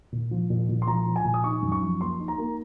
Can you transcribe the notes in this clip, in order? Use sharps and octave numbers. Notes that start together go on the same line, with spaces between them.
A#2
F3
A#2
A#2
C6
F3 A#5
F3
G#5
A#2
D#6
D#4 C#6
F#2
C#6
F3
A#3 C6
D#4
A#5
A#3